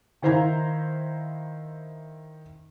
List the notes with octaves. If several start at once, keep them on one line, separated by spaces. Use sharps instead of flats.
D#3 E4 C5 F5 A#5 G#6